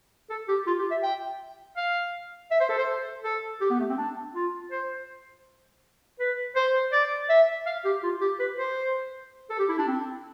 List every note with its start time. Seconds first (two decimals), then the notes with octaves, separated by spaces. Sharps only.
0.30 A4
0.48 G4
0.67 F4
0.79 G4
0.91 E5
1.03 G5
1.77 F5
2.51 E5
2.60 C5
2.69 A4
2.78 C5
3.24 A4
3.61 G4
3.70 B3
3.80 A3
3.89 C4
3.98 D4
4.35 F4
4.71 C5
6.19 B4
6.55 C5
6.92 D5
7.29 E5
7.66 F5
7.85 G4
8.03 F4
8.21 G4
8.40 B4
8.58 C5
9.50 A4
9.59 G4
9.69 E4
9.79 D4
9.87 C4